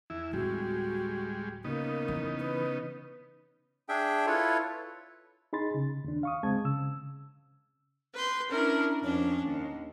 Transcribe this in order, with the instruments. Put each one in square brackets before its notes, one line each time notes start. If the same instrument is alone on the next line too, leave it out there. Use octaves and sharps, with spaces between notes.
[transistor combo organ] E2 E4
[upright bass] D1 [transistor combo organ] G3 G#3 [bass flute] F#4
[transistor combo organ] C#3 B3 D#4 [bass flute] A#3
[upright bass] E3
[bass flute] B4
[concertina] D4 G#4 E5 G5
E4 F4 A4 B4 C#5
[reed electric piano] D#4 G#4 B5 C6 A6
C#3
D#2 D4
F5 C#6 D#6
C#2 G#3 C4 A5 G#6
C#3 E6
[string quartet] B4 C6 G6
C#4 D4 E4 A#4
F2 C#4 D4
D#2